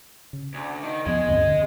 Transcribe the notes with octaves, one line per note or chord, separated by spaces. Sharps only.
C#3
D2
D#3
E2 F3 B3 G#4 D#5
D2 G2 C4
D3